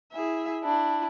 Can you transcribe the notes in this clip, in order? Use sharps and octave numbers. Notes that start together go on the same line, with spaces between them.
E4 G#4 E5
D4 E4